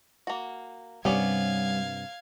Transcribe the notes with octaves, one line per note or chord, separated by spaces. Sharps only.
A#3 F#4
G2 C3 G3 B3 C#4 D5 F5 G#6